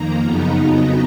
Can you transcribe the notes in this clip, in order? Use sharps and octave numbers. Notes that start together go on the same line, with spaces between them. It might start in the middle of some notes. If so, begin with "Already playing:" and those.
Already playing: F2 D#3 A#3 A#5
F#2 C#3 F3 B3 D#4
F2 C#3 F#3 B3 D#4